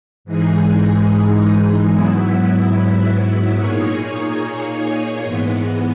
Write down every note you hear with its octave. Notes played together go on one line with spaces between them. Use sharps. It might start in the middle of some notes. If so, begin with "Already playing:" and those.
G#2 E3 G#3 D#4 G#4
G#2 F#3 B3 E4
A#2 A#3 D#4 G#4 C#5
G#2 E3 G#3 B3